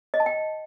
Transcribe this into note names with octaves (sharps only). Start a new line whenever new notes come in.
D#5
A5
G5